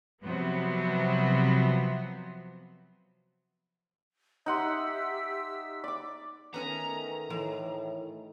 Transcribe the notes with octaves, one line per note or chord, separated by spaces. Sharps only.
C3 F3 F#3 B3
D#4 G4 E5 F#5 C6 E6
D5 D6
D#3 A3 B3 C#4 G#5 A#5
A2 E3